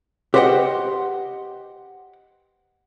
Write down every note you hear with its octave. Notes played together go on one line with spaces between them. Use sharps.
G4 B4 C5 D#5 F#5 G5